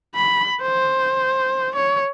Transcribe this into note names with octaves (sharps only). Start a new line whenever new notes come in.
B5
C5
C#5